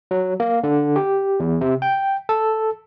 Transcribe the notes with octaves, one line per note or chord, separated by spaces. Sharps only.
F#3
A#3
D3
G4
E2
C3
G5
A4